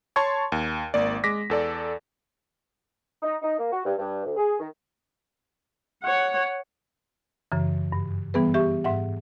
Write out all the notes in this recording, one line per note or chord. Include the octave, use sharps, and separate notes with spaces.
C#5 A5 C6 C#6 G#6
D#2
G#1 A#3 D5
G#3 D6 A#6 B6
E2 A4 D5
D#4
D#4
A#3
F#4
G2
G2
D2
G#4
D#3
C#5 F#5
F#2 C#3 E3
G2
E3 G3 B3 G#4 B4
G4 E5 C#6
G#2 E5 F#5